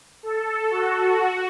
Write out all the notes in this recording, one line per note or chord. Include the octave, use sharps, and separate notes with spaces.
A4
F#4
F#4